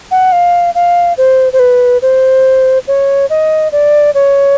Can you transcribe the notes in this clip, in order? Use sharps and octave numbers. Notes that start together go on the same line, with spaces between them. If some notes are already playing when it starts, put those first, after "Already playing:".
F#5
F5
F5
C5
C5
B4
C5
C#5
D#5
D5
C#5